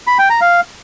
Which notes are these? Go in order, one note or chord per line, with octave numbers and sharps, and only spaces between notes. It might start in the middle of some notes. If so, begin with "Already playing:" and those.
B5
G5
A#5
F5